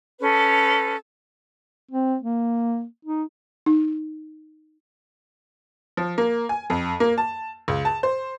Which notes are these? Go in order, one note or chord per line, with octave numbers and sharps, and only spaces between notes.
C#4 A4 B4
C4
A#3
D#4
D#4
F3
A#3
G#5
F2
A#3
A5
C#2
A5
C5